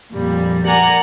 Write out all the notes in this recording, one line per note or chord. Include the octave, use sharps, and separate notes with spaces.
F2 A#2 G3
A#4 D5 F#5 G#5 A#5